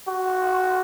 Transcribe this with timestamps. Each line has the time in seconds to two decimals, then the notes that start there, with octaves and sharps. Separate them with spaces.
0.08 F#4